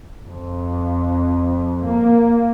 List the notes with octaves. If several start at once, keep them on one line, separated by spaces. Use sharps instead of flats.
F2
A#3